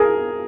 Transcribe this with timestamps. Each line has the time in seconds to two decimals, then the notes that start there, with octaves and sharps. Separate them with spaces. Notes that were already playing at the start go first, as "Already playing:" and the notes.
Already playing: G#4 A#4